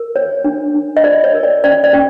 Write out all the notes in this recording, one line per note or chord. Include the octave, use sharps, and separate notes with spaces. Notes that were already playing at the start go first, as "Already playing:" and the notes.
Already playing: A#4
C#5
D4
D4
D#5
F4 D5
C#5
A#4
D5
C#4 D5
D5
C#4